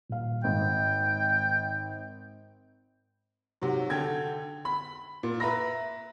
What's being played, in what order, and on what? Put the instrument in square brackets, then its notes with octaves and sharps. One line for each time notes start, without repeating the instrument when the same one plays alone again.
[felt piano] D#1 F5
[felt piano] G#1 [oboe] G5
[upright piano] G#2 C3 F#3
D3 A4 G5 G#6
B5
A#2
B4 E5 A#5 B5 A#6